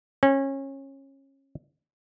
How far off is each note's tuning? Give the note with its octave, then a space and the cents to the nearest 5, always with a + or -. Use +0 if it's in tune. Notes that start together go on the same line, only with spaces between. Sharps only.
C#4 -25